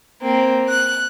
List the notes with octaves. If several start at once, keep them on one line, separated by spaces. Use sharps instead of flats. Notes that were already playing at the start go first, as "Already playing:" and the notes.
A#3 C4
F#6